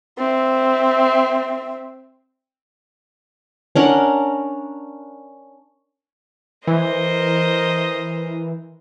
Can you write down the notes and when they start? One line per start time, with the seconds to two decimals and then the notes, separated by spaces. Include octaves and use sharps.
0.18 C4 E5
3.75 C#4 D4 A#4 F#5
6.67 E3 A#4 C5 D#5